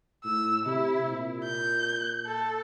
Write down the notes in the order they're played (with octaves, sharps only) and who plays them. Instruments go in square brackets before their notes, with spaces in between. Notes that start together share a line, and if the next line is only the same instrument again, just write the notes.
[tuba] A2 [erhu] E6
[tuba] C3 [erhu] E4
[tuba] A#2
[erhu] G6
A4